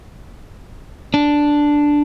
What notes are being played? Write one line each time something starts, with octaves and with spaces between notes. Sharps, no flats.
D4